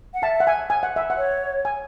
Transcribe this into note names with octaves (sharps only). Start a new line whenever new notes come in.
F#5
E5 A5
F#5
G#5
G#5
F#5
E5
F#5
C#5
G#5